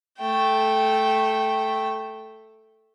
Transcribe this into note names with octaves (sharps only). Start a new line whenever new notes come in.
A3 G5